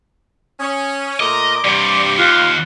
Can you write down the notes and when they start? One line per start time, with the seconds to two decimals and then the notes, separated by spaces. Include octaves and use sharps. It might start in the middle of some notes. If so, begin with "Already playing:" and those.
0.60 C#4 D#6
1.20 A#2 A3 A#4 D#5 D6
1.64 G2 C3 G3 G4 D5
2.19 D#2 F4 F#6